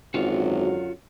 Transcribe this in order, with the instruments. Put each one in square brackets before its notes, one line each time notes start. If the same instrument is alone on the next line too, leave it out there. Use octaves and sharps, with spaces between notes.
[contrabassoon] G#1 [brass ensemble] F#2 D3 F#3 [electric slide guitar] F4 F#4